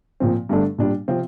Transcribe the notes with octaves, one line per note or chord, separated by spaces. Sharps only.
A#2 F3 C4
G2 D3 A3 D4 A4
A#2 G3 D4
C3 F3 C4 F4